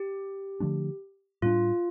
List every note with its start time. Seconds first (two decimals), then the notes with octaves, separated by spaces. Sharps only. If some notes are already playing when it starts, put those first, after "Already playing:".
Already playing: G4
0.60 D3 F3 A3 D4
1.42 A2 G3 B3 D4 F4